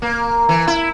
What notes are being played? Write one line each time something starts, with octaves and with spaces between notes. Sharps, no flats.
A#3
E3
E4